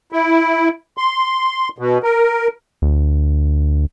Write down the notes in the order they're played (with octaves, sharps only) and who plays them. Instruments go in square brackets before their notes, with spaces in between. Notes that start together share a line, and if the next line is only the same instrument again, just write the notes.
[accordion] E4
C6
B2
A#4
[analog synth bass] D2